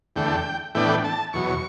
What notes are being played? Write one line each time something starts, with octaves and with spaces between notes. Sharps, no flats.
E2 D3 A3 G5
A2 E3 B3 D4 G5
A5
E2 B2 F#3 C#6